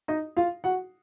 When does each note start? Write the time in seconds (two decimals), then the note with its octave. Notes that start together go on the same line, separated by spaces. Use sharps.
0.08 D#4 D#5
0.37 F4 F5
0.64 F#4 F#5